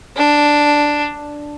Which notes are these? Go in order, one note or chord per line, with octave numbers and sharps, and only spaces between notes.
D4